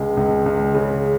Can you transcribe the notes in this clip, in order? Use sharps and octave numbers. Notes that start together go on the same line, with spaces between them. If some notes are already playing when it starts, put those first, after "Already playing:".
Already playing: C#2 G#3
C#2
C#2
C#3